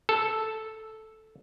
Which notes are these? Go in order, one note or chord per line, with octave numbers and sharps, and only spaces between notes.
A4